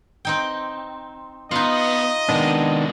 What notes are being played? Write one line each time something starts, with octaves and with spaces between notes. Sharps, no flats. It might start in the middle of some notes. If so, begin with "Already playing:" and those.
C4 D#4 G5
B3 D#4 F4 D#5
C3 D#3 G#3 B3 D4